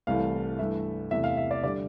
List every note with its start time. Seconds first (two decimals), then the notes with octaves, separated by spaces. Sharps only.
0.07 C2 C3 E3 A3 F5
0.59 G2 E3 A3 E5
1.11 E2 C3 E3 A3 E5
1.24 F5
1.37 E5
1.51 D5
1.63 D3 G3 D5